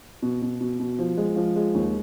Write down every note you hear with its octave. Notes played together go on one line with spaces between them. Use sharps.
B2
B2
B2
B2
F3
G#3
F3
G#3
D#2